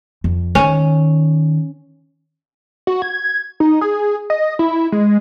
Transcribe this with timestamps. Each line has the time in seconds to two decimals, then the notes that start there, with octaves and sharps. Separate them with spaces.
0.24 F2
0.55 D#3 C#4
2.87 F#4
3.02 G#6
3.60 D#4
3.81 G#4
4.30 D#5
4.59 E4
4.92 G#3